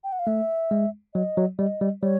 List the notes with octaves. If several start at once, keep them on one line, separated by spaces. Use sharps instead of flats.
G5
F#5
F5
A3 E5
G#3
F#3 D#5
F#3
G3 D#5
G3
G3 C#5